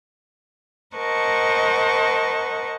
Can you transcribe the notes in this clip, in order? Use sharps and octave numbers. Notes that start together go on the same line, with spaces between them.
A#4 C5 D#5 F#5 A5 C#6